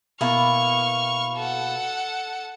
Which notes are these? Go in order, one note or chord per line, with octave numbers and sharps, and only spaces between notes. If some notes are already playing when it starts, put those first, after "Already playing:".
B2 A#3 E4 C#6 F6
A4 F#5